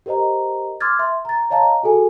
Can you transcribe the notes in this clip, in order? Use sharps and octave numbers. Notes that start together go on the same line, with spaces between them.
G4 A#4 C5 D#5 A#5
C6 D6 E6 F6 G#6 A6
E5 C6
A#5 A6
C#5 D#5 F5 A5 A#5
F#4 G#4 A4 G#5